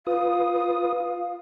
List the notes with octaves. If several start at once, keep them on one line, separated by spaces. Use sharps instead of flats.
F4 B4 F5 D#6